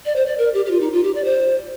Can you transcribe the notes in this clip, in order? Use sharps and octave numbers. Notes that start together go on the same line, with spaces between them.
D5
C5
D5
A#4
G4
G4
F4
D#4
F4
G4
D5
C5